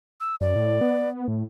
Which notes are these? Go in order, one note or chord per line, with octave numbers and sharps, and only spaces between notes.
E6
F#2 D5
A2
B3
A2